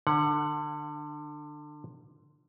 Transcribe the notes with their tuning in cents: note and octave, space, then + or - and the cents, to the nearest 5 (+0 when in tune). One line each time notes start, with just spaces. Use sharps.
D3 +25 F#5 +0